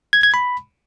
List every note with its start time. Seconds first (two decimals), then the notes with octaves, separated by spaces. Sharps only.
0.13 G#6
0.23 G#6
0.34 B5